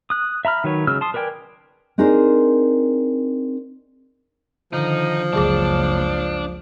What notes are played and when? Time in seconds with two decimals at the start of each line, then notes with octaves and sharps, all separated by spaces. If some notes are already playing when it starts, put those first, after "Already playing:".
0.10 D#6 F#6
0.45 E5 A#5 B5 F6
0.64 D#3 F#3 B4 C#5
0.87 C#3 F#3 G#3 E6 F6
1.01 A5 C6 D#6
1.14 A#4 B4 D5 G5 G#5
1.98 C4 D4 D#4 G#4 A#4 C5
4.73 D3 D#3 F3 D#4
5.33 F#1 C#2 F#3 D4 G#4 D6